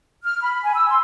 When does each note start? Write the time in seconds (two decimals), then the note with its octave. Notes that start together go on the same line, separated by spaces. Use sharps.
0.24 F6
0.41 B5
0.63 G#5
0.75 E6
0.89 C6